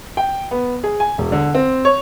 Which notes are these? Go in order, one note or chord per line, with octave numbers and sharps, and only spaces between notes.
G5
B3
G#4
G#5
E1
D3
C4
C#5